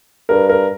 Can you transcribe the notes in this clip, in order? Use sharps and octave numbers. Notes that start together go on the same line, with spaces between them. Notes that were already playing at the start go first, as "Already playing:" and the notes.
G2 A#4
A#4